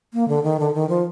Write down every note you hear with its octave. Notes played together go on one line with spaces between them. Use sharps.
A#3
D3
D#3
D3
D#3
F3